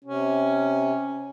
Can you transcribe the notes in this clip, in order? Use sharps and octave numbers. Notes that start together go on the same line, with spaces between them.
C3 C#4